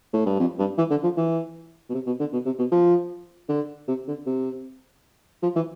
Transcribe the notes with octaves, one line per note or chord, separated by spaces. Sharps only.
A2
G2
F2
G2
E3
D3
F3
E3
B2
C3
B2
D3
B2
C3
B2
F3
D3
C3
D3
C3
F3
E3